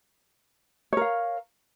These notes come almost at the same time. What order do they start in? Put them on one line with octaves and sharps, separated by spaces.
C#5 A#4 F5